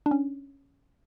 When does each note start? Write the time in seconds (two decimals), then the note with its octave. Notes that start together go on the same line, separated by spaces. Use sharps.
0.06 D4
0.11 C#4